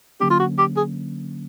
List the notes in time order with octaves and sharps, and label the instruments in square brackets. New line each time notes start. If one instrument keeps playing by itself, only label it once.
[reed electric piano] D3 F#3 A#3 C#4 [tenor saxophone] G4
[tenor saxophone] F4
F#4
G4
G#4